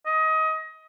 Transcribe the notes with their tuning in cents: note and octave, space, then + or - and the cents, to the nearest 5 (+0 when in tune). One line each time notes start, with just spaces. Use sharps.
D#5 +25